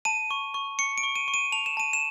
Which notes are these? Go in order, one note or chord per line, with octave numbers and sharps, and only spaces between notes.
A5 D#7
C#6
C#6
C#6 C#7
D7
C#6
D#7
C#6
D#7
A5 F7
E7
A5 D#7
E7